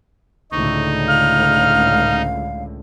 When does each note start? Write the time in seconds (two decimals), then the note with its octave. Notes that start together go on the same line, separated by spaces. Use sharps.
0.52 C#2 A2 D3 D#4 C#6
1.07 F5 F6